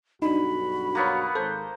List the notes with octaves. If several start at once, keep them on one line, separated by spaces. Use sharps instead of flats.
B1 G2 D4 D#4 F#4 B5
A#3 B3 C#5
G#1 A4 C5